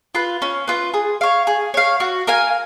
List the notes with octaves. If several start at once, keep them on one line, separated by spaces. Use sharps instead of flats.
F4 B4
C#4
F4 B4
G#4
C#5 F5
G#4
C#5 F5
F#4
A#4 F5 G#5